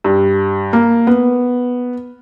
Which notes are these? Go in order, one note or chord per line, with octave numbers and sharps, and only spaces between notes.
G2
A#3
B3